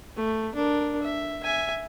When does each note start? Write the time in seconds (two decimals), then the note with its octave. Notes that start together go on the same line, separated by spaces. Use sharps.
0.16 A3
0.55 D4 A#4
1.02 E5
1.43 E5 G#5